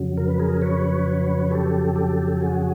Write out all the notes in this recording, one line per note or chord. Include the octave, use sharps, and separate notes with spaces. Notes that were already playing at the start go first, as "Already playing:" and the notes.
Already playing: F2 C#3 F#3
A#4
B4
G#4 A#4
B4 C#5
G4 A4
G4 A4
F#4 G#4